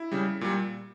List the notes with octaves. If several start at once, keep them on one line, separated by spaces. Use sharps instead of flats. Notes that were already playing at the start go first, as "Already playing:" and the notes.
Already playing: E4
C#3 G3
A#2 G3